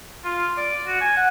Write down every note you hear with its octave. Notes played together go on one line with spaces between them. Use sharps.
F4
D5
F#4
G#5
F#5